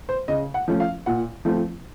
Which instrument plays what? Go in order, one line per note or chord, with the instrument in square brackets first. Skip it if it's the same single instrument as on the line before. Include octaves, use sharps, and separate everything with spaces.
[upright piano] C5
C#3 D#5
F#5
F3 A3 C#4
F5
A#2 F#5
F3 A3 C4